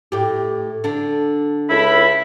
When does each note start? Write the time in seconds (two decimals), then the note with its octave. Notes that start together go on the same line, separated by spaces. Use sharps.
0.12 A2 G4
0.84 D3 D4
1.70 C#2 E4 B5